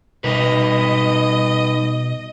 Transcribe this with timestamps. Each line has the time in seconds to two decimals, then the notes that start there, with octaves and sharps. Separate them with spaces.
0.24 B2 G3 D#4 B4 D#5